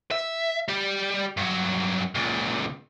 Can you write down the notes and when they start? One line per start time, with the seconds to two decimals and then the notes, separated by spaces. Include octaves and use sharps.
0.11 E5
0.68 G3 G4
1.37 G2 F#3
2.15 C#2 A#2